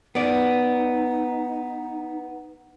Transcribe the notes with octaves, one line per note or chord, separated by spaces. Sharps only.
B3 D#4 D5